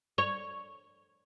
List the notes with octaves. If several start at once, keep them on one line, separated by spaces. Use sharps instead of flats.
C#5